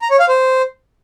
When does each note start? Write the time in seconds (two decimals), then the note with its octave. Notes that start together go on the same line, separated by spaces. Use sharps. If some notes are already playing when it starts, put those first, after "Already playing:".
0.02 A#5
0.11 C#5
0.20 F5
0.29 C5